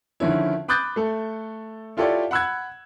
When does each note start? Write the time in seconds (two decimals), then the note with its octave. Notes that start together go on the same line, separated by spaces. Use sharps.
0.20 D3 D#3 F3 C#4 E4
0.68 B5 D6 D#6 F#6 G6 A6
0.96 A3 A4
1.97 E4 F4 G4 A4 C#5 D5
2.31 F#5 B5 E6 F#6 G#6